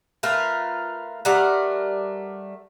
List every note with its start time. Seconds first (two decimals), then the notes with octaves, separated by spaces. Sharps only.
0.23 A3 F4 A#4 B4
1.25 G3 A3 A#4 F#5